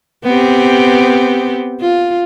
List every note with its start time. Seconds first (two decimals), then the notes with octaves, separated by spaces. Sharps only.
0.24 B3 C4 G4
1.81 F4